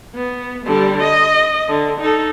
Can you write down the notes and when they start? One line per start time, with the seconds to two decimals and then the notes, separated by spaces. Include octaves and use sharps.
0.15 B3
0.66 D3 G3
1.03 D#5
1.68 D3
2.01 D#4 A4